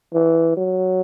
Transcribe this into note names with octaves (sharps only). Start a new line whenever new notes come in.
E3
F#3